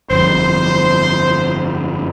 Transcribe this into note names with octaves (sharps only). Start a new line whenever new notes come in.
G1 F2 C5